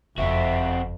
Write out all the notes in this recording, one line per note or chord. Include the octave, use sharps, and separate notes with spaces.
F#1 F2 C4 F#4 E5